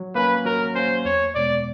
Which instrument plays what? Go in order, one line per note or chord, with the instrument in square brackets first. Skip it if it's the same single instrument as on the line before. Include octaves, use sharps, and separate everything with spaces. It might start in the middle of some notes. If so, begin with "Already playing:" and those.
Already playing: [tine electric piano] F#3
[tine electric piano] A#3 C#4 [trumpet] B4
[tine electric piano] F#3 [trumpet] A#4
[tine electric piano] A#3 C#4 [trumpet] C5
[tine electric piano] E2 [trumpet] C#5
[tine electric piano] B2 G#3 B3 [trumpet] D5